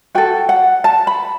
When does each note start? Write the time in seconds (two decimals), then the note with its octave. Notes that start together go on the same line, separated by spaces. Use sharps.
0.15 F#4 A4 G5
0.49 F#5
0.84 A5
1.07 B5